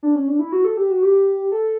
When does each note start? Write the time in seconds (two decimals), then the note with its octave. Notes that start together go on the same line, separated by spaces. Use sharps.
0.03 D4
0.15 C#4
0.28 D4
0.39 E4
0.52 F#4
0.65 A4
0.77 G4
0.90 F#4
1.03 G4
1.52 A4